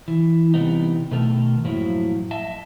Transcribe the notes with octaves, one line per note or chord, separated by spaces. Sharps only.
E3
C3 E3 G3 B3 D#4
B2 D#3 A3 A4 A#4
F#2 A2 F3 F#3 A#3 E4
D#5 E5 A5